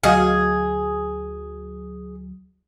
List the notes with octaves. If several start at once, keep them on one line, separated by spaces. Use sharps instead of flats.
D2 F#3 F#4 G#4 D#5 F5